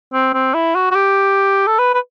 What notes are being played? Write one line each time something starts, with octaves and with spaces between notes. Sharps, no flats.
C4
C4
E4
F#4
F#4
G4
A4
B4
B4